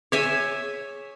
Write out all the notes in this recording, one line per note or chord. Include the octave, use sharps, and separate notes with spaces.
G#4 C#5 E5 G#5